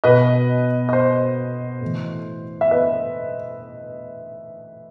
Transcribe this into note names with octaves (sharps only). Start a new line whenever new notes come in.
B2 B4 D#5
D#5
C5
A2 E3
E5
B4 D#5